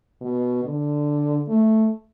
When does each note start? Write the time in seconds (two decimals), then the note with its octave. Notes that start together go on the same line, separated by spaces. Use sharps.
0.21 B2
0.64 D3
1.48 A3